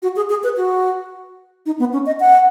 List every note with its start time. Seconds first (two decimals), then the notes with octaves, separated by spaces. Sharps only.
0.02 F#4
0.16 G#4
0.30 G#4
0.43 B4
0.56 F#4
1.66 D#4
1.79 B3
1.93 C#4
2.06 D#5
2.20 F#5